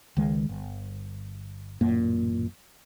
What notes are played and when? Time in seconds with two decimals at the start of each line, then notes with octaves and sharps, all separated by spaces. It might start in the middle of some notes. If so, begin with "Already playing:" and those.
0.17 C#2 D#3 G#3
0.49 G1
1.81 A1 F#2 A#2 A#3